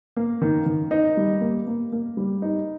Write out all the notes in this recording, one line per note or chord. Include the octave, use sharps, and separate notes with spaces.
A#3
D#3
D#3
D#4
G3
A#3
A#3
A#3
G3
D#4